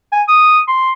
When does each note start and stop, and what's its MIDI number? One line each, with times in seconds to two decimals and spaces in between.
0.12 0.22 80
0.28 0.60 87
0.68 0.91 84